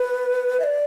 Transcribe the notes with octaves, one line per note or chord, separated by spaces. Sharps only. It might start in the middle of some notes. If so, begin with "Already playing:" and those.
Already playing: B4
E5
D5